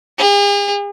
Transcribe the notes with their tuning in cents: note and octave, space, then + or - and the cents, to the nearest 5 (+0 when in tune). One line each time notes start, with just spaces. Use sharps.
G#4 -45